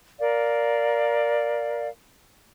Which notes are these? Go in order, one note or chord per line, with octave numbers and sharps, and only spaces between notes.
A#4 D5 F5